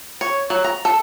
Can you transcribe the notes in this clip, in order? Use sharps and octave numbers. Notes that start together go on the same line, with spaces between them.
C#5
F#3
A#5
A4